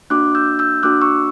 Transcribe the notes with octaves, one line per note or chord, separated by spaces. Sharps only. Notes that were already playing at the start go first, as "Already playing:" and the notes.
A#3 D4 F#4 D6 F#6
E6 G6
E6 G6
A#3 D4 F#4 D6 F#6
C#6 E6